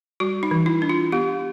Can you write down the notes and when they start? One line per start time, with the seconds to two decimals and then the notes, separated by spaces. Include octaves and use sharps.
0.20 G3 F#4
0.43 D#4
0.51 E3
0.66 E4
0.82 D4
0.89 F4
1.12 B3 G4